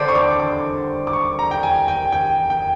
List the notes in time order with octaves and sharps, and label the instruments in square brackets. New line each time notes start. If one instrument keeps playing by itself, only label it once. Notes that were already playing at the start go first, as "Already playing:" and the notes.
Already playing: [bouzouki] D3 G3 C4 [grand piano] D6
[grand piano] C#6
D6
D6
D6
C#6
A#5
G5
G#5
G5
G5
G5